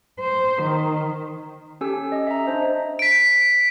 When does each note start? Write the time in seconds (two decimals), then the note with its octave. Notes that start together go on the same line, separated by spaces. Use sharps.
0.20 C5
0.62 D#3
1.81 C#4 G4 A4 G#5 E6
2.12 D#5
2.27 E5 A#5
2.47 D4 C5
2.99 B6 D7